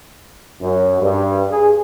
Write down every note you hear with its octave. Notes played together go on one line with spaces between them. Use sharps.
F#2
G2
G#4